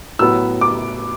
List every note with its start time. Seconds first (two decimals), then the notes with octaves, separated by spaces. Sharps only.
0.19 A2 F#3 B3 E6
0.61 D6